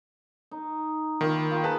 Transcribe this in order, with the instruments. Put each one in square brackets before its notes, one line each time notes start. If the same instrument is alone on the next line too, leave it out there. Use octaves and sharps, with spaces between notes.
[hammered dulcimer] D#4
[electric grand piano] D#3 [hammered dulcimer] A#3 E4 F4
[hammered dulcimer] F4 G5
[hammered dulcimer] D#4 G#4 G5 [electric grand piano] B4 A5